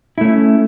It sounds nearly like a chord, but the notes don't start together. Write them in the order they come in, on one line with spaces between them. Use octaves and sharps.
E4 A3 C#4